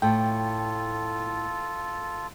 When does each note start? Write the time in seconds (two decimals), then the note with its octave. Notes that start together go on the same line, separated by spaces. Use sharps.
0.02 A2 F4 A4 G5